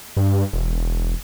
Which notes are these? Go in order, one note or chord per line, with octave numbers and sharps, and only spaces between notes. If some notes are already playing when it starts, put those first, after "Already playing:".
G2
E1